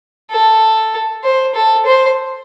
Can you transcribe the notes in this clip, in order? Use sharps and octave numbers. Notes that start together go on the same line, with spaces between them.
A4
C5
A4
C5